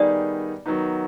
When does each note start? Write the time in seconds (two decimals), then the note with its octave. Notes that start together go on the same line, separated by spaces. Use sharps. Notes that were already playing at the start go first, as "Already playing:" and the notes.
Already playing: D#3 G3 B3 D#4 G#4 D5
0.66 D#3 F#3 B3 D#4